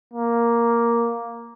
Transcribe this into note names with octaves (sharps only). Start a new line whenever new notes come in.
A#3